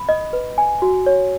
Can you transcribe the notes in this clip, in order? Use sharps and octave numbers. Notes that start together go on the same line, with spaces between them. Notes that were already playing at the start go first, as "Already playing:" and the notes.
Already playing: B5
D#5
B4
G#5
F#4
C#5